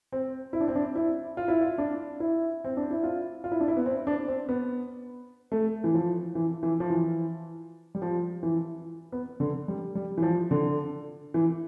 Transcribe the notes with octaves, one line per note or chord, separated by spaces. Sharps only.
C4
E4
D4
C4
D4
E4
F4
E4
F4
D4
E4
C4
D4
E4
F4
F4
E4
D4
E4
B3
C4
D4
C4
B3
A3
E3
F3
E3
E3
F3
E3
G3
F3
E3
B3
D3
G3
G3
E3
F3
D3
E3